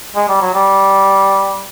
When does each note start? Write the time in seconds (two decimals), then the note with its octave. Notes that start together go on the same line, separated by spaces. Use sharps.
0.16 G#3
0.28 G3
0.41 F#3
0.54 G3